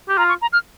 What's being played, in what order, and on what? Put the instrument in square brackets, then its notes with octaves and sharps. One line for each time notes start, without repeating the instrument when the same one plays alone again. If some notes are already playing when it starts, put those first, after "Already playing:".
[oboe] G4
[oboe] F4 [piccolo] A#5
[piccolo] C#6
A#5
F6